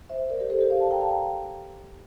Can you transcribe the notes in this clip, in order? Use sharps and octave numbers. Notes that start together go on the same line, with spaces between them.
C5 E5
A#4 D5
G4 A#4
A4 C5
G4 A#4
D5 F5
F5 A5
G5 A#5
F5 A5
G5 A#5